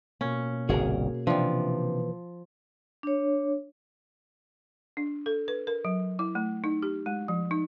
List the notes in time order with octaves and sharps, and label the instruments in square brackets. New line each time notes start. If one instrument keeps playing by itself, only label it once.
[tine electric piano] B2 A#3 [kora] C#4
[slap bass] G1 C2 [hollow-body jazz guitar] F#4 G#4 A#4
[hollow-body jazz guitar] C3 D4 [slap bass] E3 [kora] F3
[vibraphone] D4 C#5
[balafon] D4
A4
B4
A#4
F#3
E4
A3
D#4
G4
G#3
F3
D#4